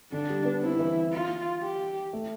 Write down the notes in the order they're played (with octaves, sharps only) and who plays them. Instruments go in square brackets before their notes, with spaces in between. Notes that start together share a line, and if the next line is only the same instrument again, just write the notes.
[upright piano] D3 [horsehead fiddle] D4
[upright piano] G3
B3
[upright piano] C4 [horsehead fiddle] E4
[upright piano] E3
[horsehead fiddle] F4
G4
[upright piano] A3